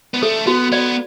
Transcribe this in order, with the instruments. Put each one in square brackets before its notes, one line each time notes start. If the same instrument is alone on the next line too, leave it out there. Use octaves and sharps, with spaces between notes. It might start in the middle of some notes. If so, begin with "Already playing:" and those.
[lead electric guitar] B3
[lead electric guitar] A3 [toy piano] A4
[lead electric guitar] B3 [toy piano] F#4
[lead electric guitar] B3 [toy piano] D5